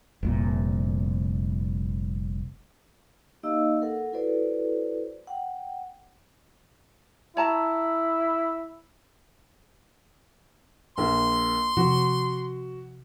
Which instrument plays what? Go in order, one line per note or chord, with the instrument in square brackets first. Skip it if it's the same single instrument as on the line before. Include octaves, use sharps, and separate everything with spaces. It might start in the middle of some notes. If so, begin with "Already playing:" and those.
[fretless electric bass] F1 C2 A#2
[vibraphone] A#3 D#4 G4 D#5 F5 E6
A4 A#4 F#5
E4 F#4 A4 B4 C5 D5
F#5 G5
[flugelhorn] E4 [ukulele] C#5 A5 A#5
[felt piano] A#1 A#3 [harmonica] C6
[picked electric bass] C3 F3 C4 [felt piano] F#4